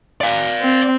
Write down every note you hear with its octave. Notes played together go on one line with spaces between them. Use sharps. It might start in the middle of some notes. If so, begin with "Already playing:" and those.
D5 F5
C4